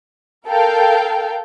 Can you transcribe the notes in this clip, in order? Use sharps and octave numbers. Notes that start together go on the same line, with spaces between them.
A4 A#4 F5 G5